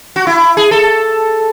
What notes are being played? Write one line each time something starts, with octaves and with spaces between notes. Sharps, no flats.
F#4
E4
G#4
A4